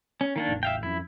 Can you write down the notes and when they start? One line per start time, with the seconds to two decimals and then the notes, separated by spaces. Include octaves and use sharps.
0.21 C#4
0.36 D#3 A#3 D4
0.49 A1 E2
0.63 E5 F5 G5
0.83 F2 C#4 E4